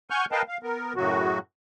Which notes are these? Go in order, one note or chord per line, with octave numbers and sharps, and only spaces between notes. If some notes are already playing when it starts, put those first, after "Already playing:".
F#5 G#5 C#6 F6 G6
A#4 B4 D#5 F5 G5 A5
F5
B3 A#4
F#2 A2 C#3 F#3 F#4